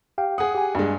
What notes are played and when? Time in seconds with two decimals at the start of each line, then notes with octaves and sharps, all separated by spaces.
0.18 G4 F5 G5
0.38 G#4 F#5 D#6
0.55 G4 G#5
0.75 G2 G#3